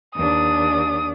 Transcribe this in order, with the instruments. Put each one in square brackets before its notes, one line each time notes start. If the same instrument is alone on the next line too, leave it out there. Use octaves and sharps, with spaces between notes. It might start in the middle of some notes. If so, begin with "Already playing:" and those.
[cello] D#2 D4 [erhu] D#6